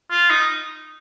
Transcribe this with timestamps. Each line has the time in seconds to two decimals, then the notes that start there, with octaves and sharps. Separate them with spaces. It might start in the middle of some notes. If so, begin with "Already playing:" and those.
0.11 F4
0.31 D#4